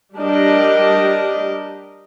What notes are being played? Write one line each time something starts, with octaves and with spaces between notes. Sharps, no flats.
G3 D4 G4 A#4 D#5